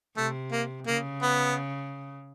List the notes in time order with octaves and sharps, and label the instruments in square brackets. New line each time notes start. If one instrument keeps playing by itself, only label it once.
[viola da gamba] C3 [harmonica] A3
[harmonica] A#3
[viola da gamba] C#3 [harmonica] A#3
[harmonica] B3